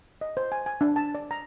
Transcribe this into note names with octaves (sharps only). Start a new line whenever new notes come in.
D#5
C5
G#5
G#5
D4
A5
D5
A#5